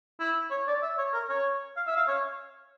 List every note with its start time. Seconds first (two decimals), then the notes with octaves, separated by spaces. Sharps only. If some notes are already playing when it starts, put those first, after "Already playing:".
0.20 E4
0.50 C#5
0.67 D5
0.82 E5
0.98 C#5
1.13 A#4
1.30 C#5
1.76 F5
1.87 E5
1.97 F5
2.08 C#5